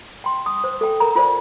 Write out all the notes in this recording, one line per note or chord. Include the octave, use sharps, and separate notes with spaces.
G5 C6
D#6
C5
A4 G5
A#4 A#5
F4 C5 D5